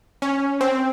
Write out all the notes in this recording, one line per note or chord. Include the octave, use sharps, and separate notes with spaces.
C#4
C4